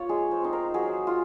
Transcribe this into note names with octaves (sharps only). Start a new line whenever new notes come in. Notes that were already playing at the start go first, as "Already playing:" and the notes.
Already playing: A#3 F4 C#5
G#3 G#4
C5
C4 D#4
A#4
F#3 G#4
F4